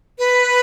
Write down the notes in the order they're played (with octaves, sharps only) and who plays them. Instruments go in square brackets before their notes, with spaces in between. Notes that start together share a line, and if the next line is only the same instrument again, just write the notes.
[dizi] B4